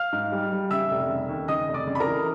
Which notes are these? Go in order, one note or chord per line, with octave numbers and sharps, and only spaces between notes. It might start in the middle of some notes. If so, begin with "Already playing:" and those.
Already playing: F5 F6
G#2
G3
G3
C#3 E5 E6
F1
C#3
D#2
C#3 D#5 D#6
F1
D5 D6
C#3
B5
A#4 A#5
E3